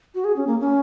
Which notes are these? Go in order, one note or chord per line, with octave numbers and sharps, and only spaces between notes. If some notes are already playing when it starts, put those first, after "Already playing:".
F#4
G#4
C#4
A#3
C#4